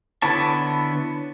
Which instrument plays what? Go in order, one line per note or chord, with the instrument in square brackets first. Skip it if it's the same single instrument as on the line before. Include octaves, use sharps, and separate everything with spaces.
[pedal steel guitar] D3 B3 E4 C#5 A5